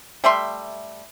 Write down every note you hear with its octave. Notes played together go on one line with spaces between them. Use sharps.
G3 A3 E5 C6